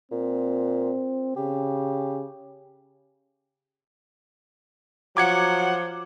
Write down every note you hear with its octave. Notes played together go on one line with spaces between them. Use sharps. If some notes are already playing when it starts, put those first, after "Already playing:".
A#2 C4
C#3 G4
F3 F#3 F#5 D6 G#6 C#7